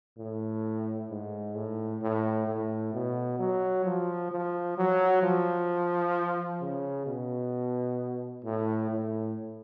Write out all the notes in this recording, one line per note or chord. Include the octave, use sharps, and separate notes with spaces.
A2
G#2
A2
A2
A2
B2
F#3
F3
F3
F#3
F3
C#3
B2
A2
A2